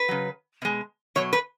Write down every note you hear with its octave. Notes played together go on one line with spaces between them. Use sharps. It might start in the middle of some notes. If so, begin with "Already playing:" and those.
Already playing: B4
C#3 F#3
B2 G#3
B2 F#3 C#5
B4